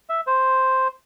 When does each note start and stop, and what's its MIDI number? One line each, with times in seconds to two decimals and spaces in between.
0.09 0.21 76
0.27 0.88 72